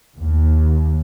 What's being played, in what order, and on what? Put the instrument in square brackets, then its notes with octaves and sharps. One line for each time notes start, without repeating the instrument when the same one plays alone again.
[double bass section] D#2